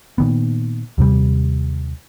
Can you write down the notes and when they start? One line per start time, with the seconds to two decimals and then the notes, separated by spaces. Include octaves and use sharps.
0.18 A#2 D#3 B3
0.98 D#2 C3 G3